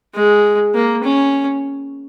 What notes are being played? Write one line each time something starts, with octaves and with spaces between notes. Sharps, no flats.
G#3
A#3
C#4